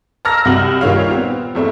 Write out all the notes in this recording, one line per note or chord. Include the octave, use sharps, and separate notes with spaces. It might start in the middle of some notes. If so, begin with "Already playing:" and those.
A5 A#5 E6 F6 A#6
C2 C3 F#4 G4 F6 F#7
A#2 D#3 G3 C#5 F5
B3 C4
E2 A3 C4 E5